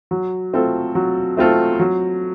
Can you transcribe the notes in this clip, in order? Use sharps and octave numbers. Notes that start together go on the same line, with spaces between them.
F#3
A3 C4 F4 A4
F#3
A3 C4 F4 A4
F#3